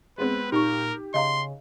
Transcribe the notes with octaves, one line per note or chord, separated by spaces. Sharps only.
G#3 B3 C4 B4
A#2 D#4 G4 A#4 C#6
C#3 D#5 F5 A#5 C6